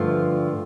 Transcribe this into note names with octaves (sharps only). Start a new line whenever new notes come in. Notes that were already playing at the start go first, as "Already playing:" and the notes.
Already playing: G2 D3 F3 A3 F4